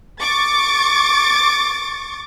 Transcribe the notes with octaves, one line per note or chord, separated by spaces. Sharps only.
C#6 D6 A6